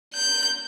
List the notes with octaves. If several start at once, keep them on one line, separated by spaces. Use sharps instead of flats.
G6